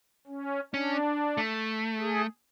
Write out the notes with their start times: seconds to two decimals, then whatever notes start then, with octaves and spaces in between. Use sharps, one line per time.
0.27 C#4
0.74 C#4 D4
1.37 A3
2.00 G#4